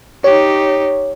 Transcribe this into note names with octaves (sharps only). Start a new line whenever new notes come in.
D#4 G4 C#5